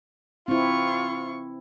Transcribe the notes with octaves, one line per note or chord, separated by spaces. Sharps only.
C4 E4 F4 C#6